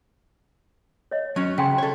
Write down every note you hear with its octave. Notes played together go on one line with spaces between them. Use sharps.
C#5 D#5
F#3 C#4
C#3 F5 G5 C6
A4 C#5